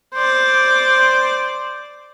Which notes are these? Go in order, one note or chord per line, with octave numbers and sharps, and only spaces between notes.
C5 D5